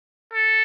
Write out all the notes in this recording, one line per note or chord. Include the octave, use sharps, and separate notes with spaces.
A4